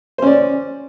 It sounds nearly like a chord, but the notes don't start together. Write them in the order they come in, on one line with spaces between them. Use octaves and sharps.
C5 C#4 D5